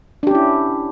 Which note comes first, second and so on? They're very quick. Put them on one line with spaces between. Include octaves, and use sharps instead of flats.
D4 G4 C#4 E4